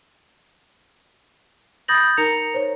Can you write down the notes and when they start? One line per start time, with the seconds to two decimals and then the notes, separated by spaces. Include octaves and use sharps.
1.88 B5 D#6 G6 A6 A#6 F#7
2.17 D#4 A#4 A#5 A#6 C#7 F7
2.54 C5 C#5